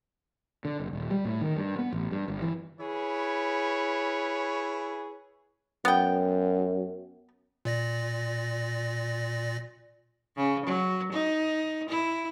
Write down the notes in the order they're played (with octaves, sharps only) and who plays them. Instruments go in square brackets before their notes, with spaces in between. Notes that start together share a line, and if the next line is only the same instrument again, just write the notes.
[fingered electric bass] D3
F#1
D#1
G3
A2
D#3
G2
B3
A1
G2
G1
E3
[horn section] E4 G#4 B4 C#5
[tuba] F#2 [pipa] B3 G5
[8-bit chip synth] A#2 D5 A#6
[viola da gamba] C#3
F#3
D#4
E4